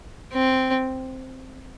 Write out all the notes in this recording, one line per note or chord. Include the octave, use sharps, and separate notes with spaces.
C4